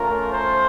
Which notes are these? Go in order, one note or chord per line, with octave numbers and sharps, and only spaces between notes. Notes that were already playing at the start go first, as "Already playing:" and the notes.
Already playing: A3 C#4 F4 A#4
C5